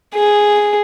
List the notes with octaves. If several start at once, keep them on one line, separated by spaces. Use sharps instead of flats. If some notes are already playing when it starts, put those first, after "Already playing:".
G#4